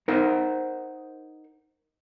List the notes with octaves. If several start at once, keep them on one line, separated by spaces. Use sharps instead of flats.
D#4 A#4 C5 F#5